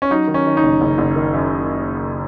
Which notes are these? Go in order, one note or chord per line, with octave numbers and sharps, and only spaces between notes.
C#4
F#3 D#4
D#3
C#4
D#3
D#4
F#1
F#1
F#1
D#3
F#2